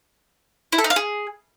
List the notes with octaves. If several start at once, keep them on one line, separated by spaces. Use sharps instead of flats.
E4
A4
D#4
F5
G#4